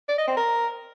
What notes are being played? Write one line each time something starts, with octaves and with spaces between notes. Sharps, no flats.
D5
D#5
C4
A#4